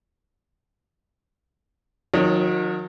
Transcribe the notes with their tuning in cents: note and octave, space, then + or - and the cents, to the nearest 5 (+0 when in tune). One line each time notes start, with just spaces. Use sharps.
D#3 +0 F#3 -35 C#5 -5